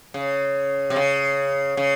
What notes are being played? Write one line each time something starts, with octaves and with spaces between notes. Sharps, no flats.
C#3
C3
C#3
C#3